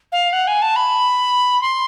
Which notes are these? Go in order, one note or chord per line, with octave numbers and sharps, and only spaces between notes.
F5
F#5
G#5
A5
B5
C6